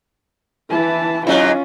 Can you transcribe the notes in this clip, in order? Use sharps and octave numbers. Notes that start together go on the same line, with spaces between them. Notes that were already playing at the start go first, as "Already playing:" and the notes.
E3 A5
G#2 F#3 C#4 E4 F4 D#5